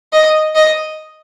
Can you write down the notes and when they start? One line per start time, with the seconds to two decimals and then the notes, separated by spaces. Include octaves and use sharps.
0.13 D#5
0.55 D#5